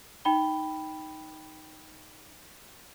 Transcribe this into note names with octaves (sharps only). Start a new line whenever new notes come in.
D#4 G5 B5 G7